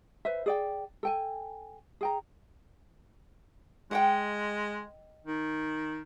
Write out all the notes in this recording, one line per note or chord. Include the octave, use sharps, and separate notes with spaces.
B4 C5 E5
G#4 D5 G5
A4 G5 G#5
G#4 G5 A#5
G#3 D#5 F#5 G5
D#3